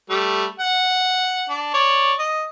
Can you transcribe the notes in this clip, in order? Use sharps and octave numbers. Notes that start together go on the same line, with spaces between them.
G3 A3
F#5
D4
C#5 D5
D#5